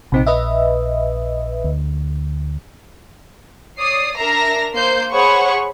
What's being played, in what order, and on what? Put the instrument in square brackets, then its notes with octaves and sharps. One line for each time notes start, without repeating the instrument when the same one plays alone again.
[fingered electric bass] A#1 [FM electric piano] C3 C4 D#4
[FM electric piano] B4 D#5 E5
[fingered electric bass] D2
[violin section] C#5 D5 D#6 C7
D4 A#4 E5 A#5 A#6 C7
A#3 C5 C6 G6 C7
G#4 C5 C#5 F#5 B5 C#6